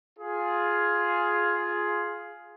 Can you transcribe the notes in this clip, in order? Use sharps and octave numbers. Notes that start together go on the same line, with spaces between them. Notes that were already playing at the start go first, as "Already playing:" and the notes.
F4 G#4